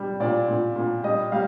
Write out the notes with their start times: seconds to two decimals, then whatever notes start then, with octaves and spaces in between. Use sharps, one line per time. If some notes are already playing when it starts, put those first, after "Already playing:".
Already playing: G3
0.20 A#2 D5
0.48 A#2
0.76 A#2
1.03 G3 D#5
1.32 G3 F5